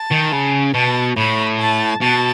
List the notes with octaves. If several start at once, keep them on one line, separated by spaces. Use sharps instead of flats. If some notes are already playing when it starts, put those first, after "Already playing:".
Already playing: A5
D#3
C#3
B2 A5
A2 B5
A5
B2 A5